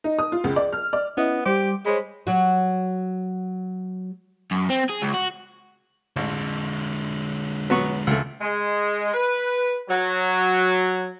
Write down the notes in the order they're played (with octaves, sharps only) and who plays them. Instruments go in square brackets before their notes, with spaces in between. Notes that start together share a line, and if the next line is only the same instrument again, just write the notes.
[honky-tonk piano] D#4
D#6
F4
C#2
D5
F6
D5
[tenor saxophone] B3 [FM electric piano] C#4 E4 D#5
[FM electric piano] G3 C5 D6 [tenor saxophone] G4
[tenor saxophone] G#3 [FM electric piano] C5 C#5 B5
[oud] F#3 F#4
[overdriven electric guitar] F#2
C4
G#4
C#2
F#4
[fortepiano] A1 [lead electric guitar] D3 G#3
[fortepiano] F#3 B3 C#6
C#2 A3
[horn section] G#3
B4
F#3